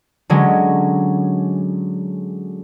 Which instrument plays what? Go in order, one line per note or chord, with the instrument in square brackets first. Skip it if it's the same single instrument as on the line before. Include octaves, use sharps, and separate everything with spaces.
[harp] D3 F#3 G#3 C#4